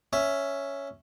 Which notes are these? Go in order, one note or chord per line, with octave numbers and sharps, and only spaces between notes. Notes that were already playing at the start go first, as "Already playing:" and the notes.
C#4 E5